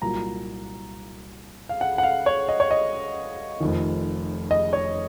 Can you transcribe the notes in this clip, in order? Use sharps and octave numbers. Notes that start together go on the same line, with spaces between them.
C2 A#2 F#3 A#3 A#5
F5
F#5
F#5
F5
C#5
D#5
C#5
D#5
F1 F2 D#3
D#5
C#5